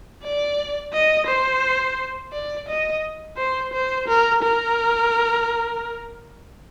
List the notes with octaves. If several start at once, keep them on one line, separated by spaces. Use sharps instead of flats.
D5
D#5
C5
D5
D#5
C5
C5
A#4
A#4